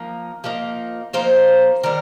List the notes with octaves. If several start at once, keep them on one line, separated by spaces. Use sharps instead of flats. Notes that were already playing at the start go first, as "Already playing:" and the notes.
Already playing: F3 A#3 D#4
F3 A#3 D#4
F3 A#3 D#4 C5
D#3 G3 A#4